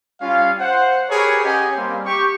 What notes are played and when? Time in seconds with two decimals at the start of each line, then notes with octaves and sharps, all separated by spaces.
0.21 G3 C#4 F4 F5
0.60 C5 F#5
1.09 G4 G#4 A#4 B4 C#5
1.44 C#4 G4 G#4 D#5 F#5 G#5
1.76 G3 A#3 C4
2.06 G4 C#6